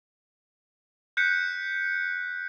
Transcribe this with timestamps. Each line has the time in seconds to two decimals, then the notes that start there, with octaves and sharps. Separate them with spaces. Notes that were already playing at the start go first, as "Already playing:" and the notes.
1.17 F#6 G6 B6 C#7